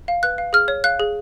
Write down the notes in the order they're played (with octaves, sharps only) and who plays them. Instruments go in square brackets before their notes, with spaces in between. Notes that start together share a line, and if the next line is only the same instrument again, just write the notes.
[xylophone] F5
B4 F#6
F5
G#4 F6
C#5
F5 F#6
G#4